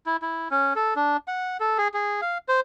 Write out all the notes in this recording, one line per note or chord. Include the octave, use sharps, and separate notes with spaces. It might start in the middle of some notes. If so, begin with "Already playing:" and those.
E4
E4
C#4
A4
D4
F#5
A4
G#4
G#4
F5
C5